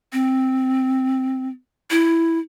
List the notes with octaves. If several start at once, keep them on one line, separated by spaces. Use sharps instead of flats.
C4
E4